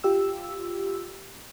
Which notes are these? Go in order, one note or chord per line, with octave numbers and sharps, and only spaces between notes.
F4 G4 E6